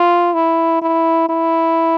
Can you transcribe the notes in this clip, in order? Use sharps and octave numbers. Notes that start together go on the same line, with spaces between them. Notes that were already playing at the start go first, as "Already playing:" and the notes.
Already playing: F4
E4
E4
E4